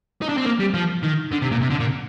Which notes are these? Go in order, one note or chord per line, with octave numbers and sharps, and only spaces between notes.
D#4
D4
C4
A#3
G3
F3
D#3
D3
C3
A#2
C3
D3
A#2